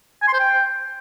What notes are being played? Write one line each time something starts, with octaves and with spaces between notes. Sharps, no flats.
G#5
C6
C5
G5